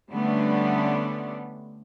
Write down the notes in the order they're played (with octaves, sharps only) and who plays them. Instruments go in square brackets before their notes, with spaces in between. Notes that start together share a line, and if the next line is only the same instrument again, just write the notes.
[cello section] D3 G3 A3 B3 C#4 D4